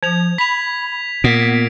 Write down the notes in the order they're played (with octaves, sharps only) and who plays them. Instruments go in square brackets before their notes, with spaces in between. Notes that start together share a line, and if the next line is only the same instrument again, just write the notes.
[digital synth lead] F3 [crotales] G#6 F7
[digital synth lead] B5 [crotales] B6 F7
[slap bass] A#2 [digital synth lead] B3 [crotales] D7